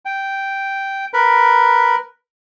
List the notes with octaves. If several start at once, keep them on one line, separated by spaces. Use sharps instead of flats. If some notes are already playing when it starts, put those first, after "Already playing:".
G5
A#4 B4 B5